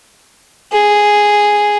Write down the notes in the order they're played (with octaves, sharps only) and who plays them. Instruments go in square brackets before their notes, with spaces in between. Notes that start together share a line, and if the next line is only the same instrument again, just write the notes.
[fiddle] G#4